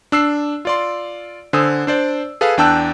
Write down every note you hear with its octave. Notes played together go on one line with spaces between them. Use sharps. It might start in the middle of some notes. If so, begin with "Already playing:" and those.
D4 E6 C7
F4 D5 C6
D3 C5 G#5 D#6 E6
D4 C5 D5
G#4 A4 B4 F5 G#5
E2 D4 G5 A5 E6 F#6